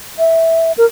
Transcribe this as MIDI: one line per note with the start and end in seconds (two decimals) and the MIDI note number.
0.19 0.72 76
0.78 0.85 70